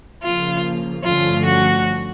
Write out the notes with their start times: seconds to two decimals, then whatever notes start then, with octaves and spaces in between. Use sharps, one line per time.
0.23 C#3 F3 A#3 F4
1.04 G2 D3 F3 A3 C#4 F4
1.45 F#4